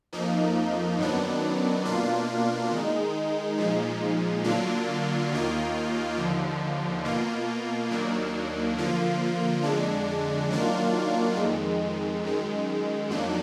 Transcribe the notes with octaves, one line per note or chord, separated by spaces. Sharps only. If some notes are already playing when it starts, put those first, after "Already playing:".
F2 F3 A#3 D#4
F#2 D#3 F#3 B3 D4
B2 A#3 D4 F4
D#3 G#3 D#4
A#2 F3 G#3 D#4
D3 F#3 A#3 D4 F4
D#2 D#3 A#3 F4
D#2 D3 F3
B2 A#3 F4
D#2 D#3 F#3 A#3 D4
D3 F3 A#3 F4
F2 D3 G#3 D4
D#3 F#3 A#3 D4 F4
F2 D#3 G#3
F#2 D#3 G#3
F2 D#3 F#3 A#3 D4